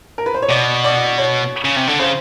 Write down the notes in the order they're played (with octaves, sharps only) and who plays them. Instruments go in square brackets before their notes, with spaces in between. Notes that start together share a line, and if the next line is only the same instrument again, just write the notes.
[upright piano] A#4
B4
C5
C#5
[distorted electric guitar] B2 [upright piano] D5
[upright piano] D5
C#5
[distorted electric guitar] C#3
C3
D3
[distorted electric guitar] C#3 [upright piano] C5